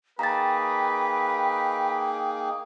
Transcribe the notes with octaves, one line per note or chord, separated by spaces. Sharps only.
A#3 D#4 G#4 B4 G5 A#5 A6